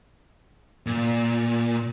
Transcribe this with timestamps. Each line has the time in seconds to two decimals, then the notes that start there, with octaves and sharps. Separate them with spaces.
0.86 A#2